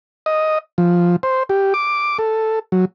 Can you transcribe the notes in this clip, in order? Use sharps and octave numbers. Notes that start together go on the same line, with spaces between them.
D#5
F3
C5
G4
D6
A4
F#3